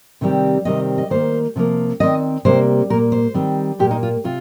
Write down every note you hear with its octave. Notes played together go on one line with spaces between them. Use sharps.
C3 D#3 G3 C4
C3 D#3 G3 C4 D#5
D#5
D#3 A#3 C5
C3 F3 A#3
D#3 C4 D#5
C3 G3 A#3 C5
A#2 A#3 A#4
C5
D#3 G3 C4
A#2 A#3 G4
D#4
F4
C3 F4